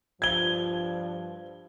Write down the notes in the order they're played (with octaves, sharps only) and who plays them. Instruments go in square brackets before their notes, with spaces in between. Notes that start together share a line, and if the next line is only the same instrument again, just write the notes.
[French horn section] G2 F3 [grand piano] G#6 G7